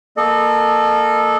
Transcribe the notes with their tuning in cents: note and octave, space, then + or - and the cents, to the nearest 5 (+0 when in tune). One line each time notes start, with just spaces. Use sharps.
A#3 -10 A4 -15 D#5 -35